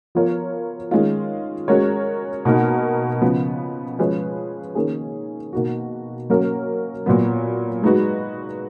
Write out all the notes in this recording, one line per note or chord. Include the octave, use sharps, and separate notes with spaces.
F3 B3 F4 A#4 C#5
D#3 G#3 C#4 F4
G#3 C#4 F#4 A#4 C#5
B2 A#3 D#4 F#4 A#4
C#3 F3 B3
F3 G#3 C#4 G#4 B4
D#3 A#3 C#4 G#4
B2 A#3 D#4 F#4
F#3 A#3 C#4 F#4 A#4
A#2 F#3 B3
G#3 D#4 F#4 B4